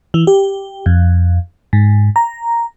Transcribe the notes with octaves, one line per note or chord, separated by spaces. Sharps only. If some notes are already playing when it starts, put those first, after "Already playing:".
E3
G4
F2
G#2
A#5